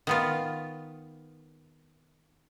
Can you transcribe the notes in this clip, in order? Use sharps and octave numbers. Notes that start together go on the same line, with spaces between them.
D#3 B3 F4